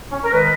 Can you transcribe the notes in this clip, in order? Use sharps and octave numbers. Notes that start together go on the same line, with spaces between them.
C#4
A#4
D#3 G#3 B4